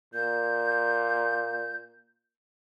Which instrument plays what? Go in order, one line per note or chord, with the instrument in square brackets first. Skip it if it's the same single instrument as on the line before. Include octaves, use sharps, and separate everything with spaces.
[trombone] A#2 [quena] G6